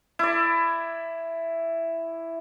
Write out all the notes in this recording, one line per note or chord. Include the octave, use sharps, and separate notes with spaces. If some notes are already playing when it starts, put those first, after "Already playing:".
E4 D5